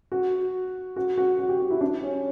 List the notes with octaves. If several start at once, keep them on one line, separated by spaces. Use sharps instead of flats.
F#4
F#4
F#4
F#4
G4
F#4
E4
D4
C#4